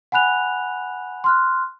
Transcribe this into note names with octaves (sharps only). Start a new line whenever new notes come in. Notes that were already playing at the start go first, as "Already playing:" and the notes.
F#5 G#5 B5 F#6 F7
C6 F6 F#6